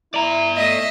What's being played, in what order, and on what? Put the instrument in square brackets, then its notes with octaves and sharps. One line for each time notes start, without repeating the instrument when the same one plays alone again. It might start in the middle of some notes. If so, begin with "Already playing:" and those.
[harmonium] E4 [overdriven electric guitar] D5 A#5
[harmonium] A3 [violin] D#5 E5